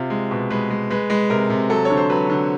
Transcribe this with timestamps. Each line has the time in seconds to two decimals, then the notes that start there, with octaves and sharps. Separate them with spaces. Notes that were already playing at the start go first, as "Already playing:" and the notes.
Already playing: C3 F4
0.10 G#3
0.31 B2
0.50 G#3 B4
0.70 G#3
0.90 G#3 B4
1.10 G#3 B4
1.30 C3 A#4
1.50 C3
1.70 F#3 A4
1.85 D3 C#5
1.97 C5
2.10 F#3 B4
2.30 D3